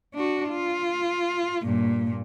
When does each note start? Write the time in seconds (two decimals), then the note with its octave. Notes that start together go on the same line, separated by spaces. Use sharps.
0.14 D4 F#4
0.50 F4
1.63 G2 A#2